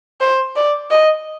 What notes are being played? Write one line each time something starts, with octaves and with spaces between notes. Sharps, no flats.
C5
D5
D#5